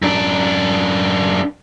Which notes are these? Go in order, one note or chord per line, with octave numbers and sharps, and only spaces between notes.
F#2 D4